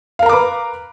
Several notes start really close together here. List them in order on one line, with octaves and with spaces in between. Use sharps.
F5 A#4 A#5 D6 B4